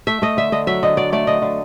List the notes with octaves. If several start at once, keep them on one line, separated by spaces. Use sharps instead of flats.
A3 E5
A3 D#5
D3 E5
D3 D#5
F#3 E5
D3 D#5
F#3 D5
A3 D5
D3 D#5
D3